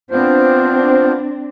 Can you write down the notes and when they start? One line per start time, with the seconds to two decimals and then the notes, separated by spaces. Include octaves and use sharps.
0.11 B3 C4 D4 F4 C5